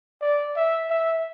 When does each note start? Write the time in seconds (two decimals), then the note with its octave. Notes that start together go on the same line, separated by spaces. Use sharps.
0.21 D5
0.56 E5
0.90 E5